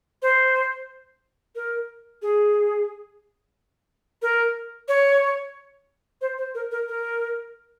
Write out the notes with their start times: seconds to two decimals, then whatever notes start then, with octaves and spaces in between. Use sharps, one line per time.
0.22 C5
1.55 A#4
2.22 G#4
4.22 A#4
4.88 C#5
6.21 C5
6.38 C5
6.55 A#4
6.71 A#4
6.88 A#4